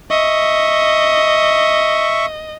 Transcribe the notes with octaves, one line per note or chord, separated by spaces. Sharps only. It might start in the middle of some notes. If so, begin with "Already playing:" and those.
D#5 E5 C#6